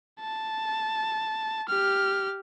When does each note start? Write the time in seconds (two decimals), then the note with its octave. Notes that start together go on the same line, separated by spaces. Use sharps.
0.20 A5
1.68 G4 F6